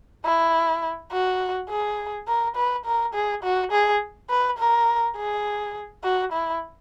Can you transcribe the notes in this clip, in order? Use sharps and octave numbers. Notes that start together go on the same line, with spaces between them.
E4
F#4
G#4
A#4
B4
A#4
G#4
F#4
G#4
B4
A#4
G#4
F#4
E4